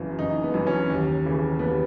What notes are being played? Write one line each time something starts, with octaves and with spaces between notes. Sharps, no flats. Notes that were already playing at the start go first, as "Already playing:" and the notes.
Already playing: F#1 F#2 E3
F#1 D#4
B3
F#2 E3
C#4
D#2
C#3 E3
D#2 B3